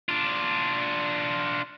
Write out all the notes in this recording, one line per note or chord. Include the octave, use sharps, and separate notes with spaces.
D4 F4